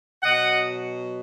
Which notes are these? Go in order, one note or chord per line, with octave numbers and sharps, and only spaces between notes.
B2 F#3 D#5 F#5